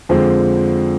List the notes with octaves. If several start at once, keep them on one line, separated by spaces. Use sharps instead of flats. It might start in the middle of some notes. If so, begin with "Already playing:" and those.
F2 D3 F3 G#3 C4